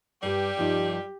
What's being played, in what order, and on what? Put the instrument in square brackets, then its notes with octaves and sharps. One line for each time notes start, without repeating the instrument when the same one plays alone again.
[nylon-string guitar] G2 B4 [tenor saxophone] G3 [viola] G4
[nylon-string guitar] G2 F3 D#4